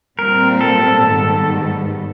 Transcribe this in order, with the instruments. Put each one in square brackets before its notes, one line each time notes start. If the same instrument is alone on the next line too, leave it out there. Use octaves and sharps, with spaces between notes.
[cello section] A#2 G3 C4 [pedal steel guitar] A#4
[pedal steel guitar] A4
[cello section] G#2 D#3 G3 B3